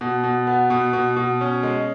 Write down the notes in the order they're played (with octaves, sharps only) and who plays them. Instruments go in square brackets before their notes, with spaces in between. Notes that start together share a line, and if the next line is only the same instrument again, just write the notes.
[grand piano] B2
B2
B3
B2
B2
B2
C#4
G#3